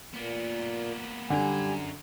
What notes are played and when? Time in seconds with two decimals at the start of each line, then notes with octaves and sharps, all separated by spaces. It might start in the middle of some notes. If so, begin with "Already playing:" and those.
0.14 A#2 A#3 B3
1.30 F#2 D3 G3 G#5 A#5